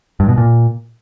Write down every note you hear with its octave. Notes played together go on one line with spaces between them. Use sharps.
G2
B2
A#2